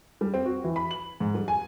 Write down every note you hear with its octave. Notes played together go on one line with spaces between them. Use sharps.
G3
C4
F#4
E3
B5
F#7
G#2
G3
G#5